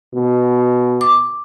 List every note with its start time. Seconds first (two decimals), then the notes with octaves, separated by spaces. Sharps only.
0.13 B2
1.01 D6